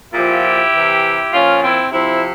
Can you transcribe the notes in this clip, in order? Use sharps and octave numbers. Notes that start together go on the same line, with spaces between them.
A#2 F3 E4 G4
C3 E3
A#2 F3 C#4 F4
C4 E4
C3 F3 C4 E4